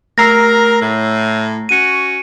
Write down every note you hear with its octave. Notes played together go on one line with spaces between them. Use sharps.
G3 A3 A#4 A#5 E6 A#6 C7
A2
C#4 F#4 C#7 D#7